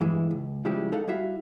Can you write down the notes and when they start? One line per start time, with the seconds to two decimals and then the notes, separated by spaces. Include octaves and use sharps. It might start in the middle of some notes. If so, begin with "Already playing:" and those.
0.01 E2 G2 E3 G#3 E4
0.31 C#2
0.65 C#3 F3 G3 G#3 E4 G4
0.92 D#4 A4 F5 F#5
1.08 G3 E4 F#4 E5 F5